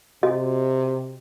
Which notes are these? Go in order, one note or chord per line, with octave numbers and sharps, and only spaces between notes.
C3 F#4 D#5